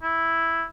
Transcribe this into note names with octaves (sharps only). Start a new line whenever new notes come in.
E4